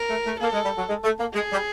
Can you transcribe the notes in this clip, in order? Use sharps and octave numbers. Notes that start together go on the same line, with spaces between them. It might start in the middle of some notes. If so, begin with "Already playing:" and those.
Already playing: A#4
A3
A3
A#3 A4
G#3
G3
F#3
G#3
A3
A#3
G#3 G#4
G3